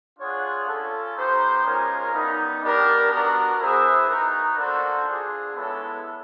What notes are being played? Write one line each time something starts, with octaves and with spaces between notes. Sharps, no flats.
D4 F4 G#4 C#5 F#5
C#4 F4 A4
B3 D#4 G4 C5
G#3 C#4 F4 A#4
G3 B3 D#4
B3 D4 G4 A#4
B3 D4 F#4 A#4
B3 E4 G#4 C5 E5
B3 D#4 F#4 A#4
A#3 D4 F#4 A4 C5
D4 F4 G#4
G#3 B3 E4 A4 C#5